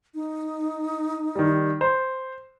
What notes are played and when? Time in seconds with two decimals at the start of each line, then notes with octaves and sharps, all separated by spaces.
0.14 D#4
1.35 D#3 G3
1.81 C5